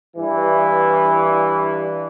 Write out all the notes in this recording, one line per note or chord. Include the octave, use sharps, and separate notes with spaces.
G2 E3